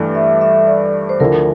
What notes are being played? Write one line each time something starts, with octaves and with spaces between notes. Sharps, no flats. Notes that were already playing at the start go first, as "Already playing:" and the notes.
Already playing: G2 E3 A3 D4
E5
E5
D5
C5
D2 D3 F3 A3 E4 A#4